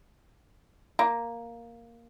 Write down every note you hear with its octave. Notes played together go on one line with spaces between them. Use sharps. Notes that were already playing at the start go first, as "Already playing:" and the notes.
A#3